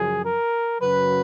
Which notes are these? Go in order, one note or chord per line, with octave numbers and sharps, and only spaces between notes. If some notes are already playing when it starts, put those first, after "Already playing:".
Already playing: F#2 C#3 F3 G#4
A#4
F#2 C#3 F#3 B4